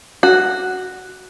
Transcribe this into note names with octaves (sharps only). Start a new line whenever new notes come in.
F#4